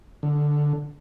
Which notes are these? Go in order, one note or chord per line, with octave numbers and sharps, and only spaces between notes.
D3